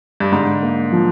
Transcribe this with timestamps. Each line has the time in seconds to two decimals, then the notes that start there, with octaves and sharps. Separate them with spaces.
0.20 G2
0.32 G#2 D3
0.63 A#3
0.92 F3